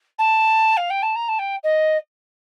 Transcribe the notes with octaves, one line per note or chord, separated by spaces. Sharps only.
A5
F5
G5
A5
A#5
A5
G5
D#5